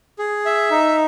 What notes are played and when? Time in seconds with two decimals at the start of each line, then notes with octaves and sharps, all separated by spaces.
0.19 G#4
0.46 E5
0.71 D#4